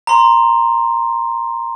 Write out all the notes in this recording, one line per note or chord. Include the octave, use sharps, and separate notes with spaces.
A#5 C6